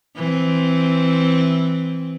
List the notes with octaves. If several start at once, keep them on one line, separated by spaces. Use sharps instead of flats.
E3 C4